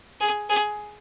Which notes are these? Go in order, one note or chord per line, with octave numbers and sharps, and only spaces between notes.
G#4
G#4